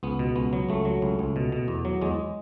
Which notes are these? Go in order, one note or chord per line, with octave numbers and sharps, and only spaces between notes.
C#2 B3
B2
C#2 B3
F#3
C#2 A3
F#3
C#2
C#2
B2
B2
E2
F#3
E2 G#3